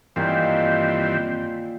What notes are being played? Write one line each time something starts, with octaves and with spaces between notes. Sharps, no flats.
G2 A#2 D#3 E3 C4